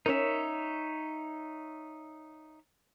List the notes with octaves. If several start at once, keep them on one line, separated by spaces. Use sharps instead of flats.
C#4 D#4 A#4 C#5 E5